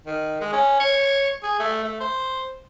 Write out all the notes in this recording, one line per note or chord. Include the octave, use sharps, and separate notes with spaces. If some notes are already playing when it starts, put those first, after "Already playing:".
D#3
G#3
C#4
C#5
G#4
A3
A3
C5